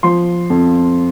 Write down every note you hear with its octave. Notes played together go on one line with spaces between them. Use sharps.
F3 C6
F2